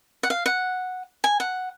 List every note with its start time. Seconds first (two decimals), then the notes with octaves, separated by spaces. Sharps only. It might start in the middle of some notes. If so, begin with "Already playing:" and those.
0.23 F#5
0.30 F5
0.46 F#5
1.24 G#5
1.40 F#5